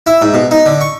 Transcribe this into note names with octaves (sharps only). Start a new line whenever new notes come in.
E4
G#2
B2
D#4
D3
C#6